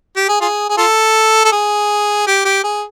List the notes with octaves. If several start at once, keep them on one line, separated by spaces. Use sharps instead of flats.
G4
G#4
F4 G#4
G#4
F4 A4
A4
G#4
G4
G4
G#4